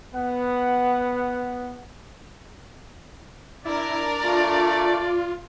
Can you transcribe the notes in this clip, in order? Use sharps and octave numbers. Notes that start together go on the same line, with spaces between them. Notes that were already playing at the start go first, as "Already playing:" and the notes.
B3 F#5
D4 E4 A#4 D5
A3 F4